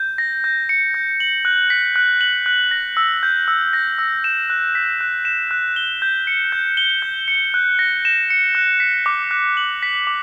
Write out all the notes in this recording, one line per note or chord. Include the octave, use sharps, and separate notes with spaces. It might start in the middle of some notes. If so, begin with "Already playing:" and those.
Already playing: G6
A#6
G6
C#7
G6
F#7
F#6
B6
F#6
F#7
F#6
A#6
E6
G6
E6
A#6
E6
E7
F#6
B6
F#6
E7
F#6
G7
G6
C#7
G6
G7
G6
C#7
F#6
A#6
E7
C#7
F#6
B6
D6
F#6
F#7
B6
D6